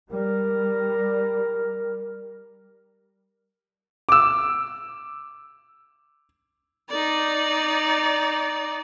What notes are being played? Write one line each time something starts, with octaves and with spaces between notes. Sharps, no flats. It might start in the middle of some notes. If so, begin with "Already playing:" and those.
G3 A#4
D6 E6
D#4 D5